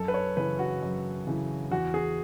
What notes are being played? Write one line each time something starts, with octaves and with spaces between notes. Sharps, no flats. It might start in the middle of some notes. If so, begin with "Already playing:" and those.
Already playing: F#2 A4
B4
C#5
C#3 E3 B4
F#4
F#2
C#3 E3
E2 F#4
G#4